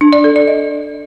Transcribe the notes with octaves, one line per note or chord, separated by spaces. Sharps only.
D4
D5
A4
D5
D#5